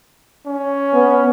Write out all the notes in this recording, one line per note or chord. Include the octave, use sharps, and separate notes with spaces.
C#4
B3